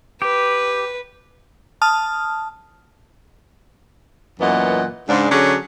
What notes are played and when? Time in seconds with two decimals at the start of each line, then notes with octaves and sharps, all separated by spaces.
0.22 G4 B4
1.82 A5 D#6 F6
4.40 F#2 A#2 E3 B3 D#5 F#5
5.09 G#2 C#3 D4
5.31 D3 F#3 C#4 D4 F#4 G#4